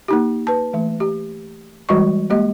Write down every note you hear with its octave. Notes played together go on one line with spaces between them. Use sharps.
A#3 D#4 G4
B4 A5
E3 A3
G4
E3 G3 G#3 F#4 D#5 C#6
G#3 A#3 G4 D#5